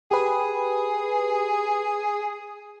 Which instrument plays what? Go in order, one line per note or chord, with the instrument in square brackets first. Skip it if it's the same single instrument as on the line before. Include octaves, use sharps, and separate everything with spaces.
[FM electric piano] G4 B4 [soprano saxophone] G#4